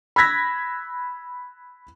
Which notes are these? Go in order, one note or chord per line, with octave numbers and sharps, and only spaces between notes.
B5 E6 F#6 G#6 A#6 B6